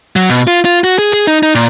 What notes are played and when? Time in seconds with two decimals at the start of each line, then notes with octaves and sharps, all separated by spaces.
0.16 F#3
0.30 B2
0.47 F4
0.65 F4
0.84 F#4
0.99 G#4
1.13 G#4
1.27 D#4
1.43 D#4
1.55 A#2